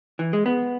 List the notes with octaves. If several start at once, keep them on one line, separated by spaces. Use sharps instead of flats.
E3
G#3
B3